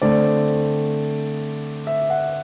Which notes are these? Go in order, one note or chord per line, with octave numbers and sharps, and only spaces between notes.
D3 A3 C4 D5
E5
F#5